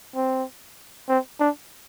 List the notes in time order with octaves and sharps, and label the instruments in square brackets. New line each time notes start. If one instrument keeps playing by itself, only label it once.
[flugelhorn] C4
C4
D4